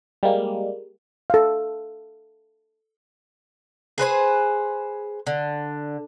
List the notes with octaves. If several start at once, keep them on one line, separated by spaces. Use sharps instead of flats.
G3 G#3 A#3
A4 F5
G#4 B4 C5 G#5
D3